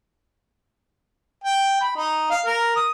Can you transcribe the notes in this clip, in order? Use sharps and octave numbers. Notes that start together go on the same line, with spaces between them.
G5
B5
D#4
F5
A#4
D#6